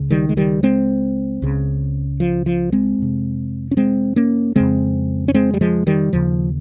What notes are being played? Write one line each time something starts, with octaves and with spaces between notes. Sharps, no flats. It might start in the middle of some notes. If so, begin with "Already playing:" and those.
Already playing: C#2 C#3
D#3 G3
G#3
D#3 G3
G#3 C4
C#2 C#3
F3
F3
G#3 C4
F2 C3
C#4
G#3 C4
A#3 C#4
F2 C#3 G#3 C4
C#4
G#3 C4
G3
F3 G#3
D#3 G3
D#2 C#3 F3